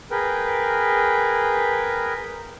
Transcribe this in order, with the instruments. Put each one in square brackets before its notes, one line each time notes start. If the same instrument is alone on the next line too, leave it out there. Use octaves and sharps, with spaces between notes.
[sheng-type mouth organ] G#4 A#4 B4 G5